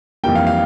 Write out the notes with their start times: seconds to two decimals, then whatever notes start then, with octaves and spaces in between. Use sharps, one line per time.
0.23 F2 E3 G3 A#3 G5
0.35 F5
0.47 F5